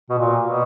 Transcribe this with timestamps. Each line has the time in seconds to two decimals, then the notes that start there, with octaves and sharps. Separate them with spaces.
0.10 B2
0.18 A#2
0.43 B2